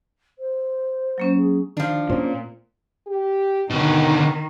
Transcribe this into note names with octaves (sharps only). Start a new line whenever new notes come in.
C5
F#3 A#3 C#4
G#4
D#3 F3 D4 F4
A#2 C4 C#4 C5
G4
B2 D3 D#3 D#4